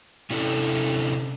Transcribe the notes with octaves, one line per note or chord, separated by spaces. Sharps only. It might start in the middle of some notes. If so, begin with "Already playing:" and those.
C3 C#4 D4 E4 A4